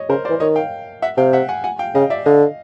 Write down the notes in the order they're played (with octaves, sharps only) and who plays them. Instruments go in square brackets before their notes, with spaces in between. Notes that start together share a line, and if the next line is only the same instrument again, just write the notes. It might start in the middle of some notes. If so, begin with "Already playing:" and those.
Already playing: [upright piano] C#5 D#5
[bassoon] C#3 [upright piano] A#4 C5
[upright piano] C5 D5
[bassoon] E3
[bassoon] D#3 [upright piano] C#5 D#5
[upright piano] F5 G5
E5 F#5
[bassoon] C3 [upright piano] F5 G5
[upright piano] E5 F#5
F#5 G#5
F#5 G#5
F5 G5
[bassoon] C#3 [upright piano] D#5 F5
[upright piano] D5 E5
[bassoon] D3 [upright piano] D#5 F5